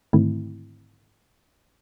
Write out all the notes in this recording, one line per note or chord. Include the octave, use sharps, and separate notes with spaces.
G#2 D3 D#3 A3 C4 E4